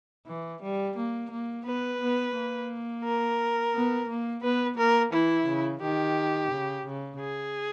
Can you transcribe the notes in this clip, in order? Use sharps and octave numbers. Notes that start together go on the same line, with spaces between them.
E3
G3
A#3
A#3
B3 B4
B3
A#3
A#4
B3
A#3
B3 B4
A#3 A#4
E3 E4
C#3
D#3 G4
C#3
C#3
G#4